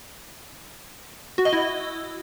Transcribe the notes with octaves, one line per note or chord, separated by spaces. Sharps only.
F#4
D#5
E4